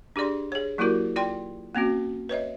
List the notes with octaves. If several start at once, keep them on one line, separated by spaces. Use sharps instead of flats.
D4 G4 G#4 D5 C6
G#4 C#5
F#3 A#3 E4 F#4 G4 A#4
F4 D5 G5 C6
A#3 C4 C#4 F#4
B4 C#5 D#5 E5